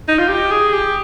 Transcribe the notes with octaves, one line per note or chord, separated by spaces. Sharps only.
D#4
F4
G4
G#4
G4